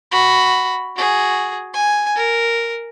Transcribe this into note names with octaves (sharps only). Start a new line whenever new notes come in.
F#4 B5
F#4 G#4
G#5
A#4